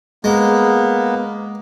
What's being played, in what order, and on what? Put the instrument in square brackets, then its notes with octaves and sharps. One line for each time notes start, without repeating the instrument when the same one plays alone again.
[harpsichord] G#3 [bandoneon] A#3 B3